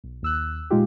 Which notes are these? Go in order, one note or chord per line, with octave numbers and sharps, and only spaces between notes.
B1
D#2 E6 F#6
A#2 G#3 D#4 F4 G4